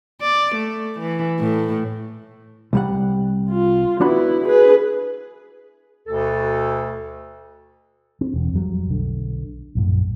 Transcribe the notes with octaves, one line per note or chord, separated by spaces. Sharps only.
D5
A3
E3
A2
C2 G3 F#5
F4
B3 D4 E4 F#4 B5
G#4 B4
D2 B2 A4
C4
E1
F2 F#3 G3
B1 D3
A#1 F#2 A2